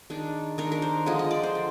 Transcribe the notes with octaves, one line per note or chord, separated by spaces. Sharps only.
D#3 G#3 D4
D#3 G#3 D4 A#4
A#4
C5
D3 F3 G#3 D4 D#5
D#5
D5
C5
D3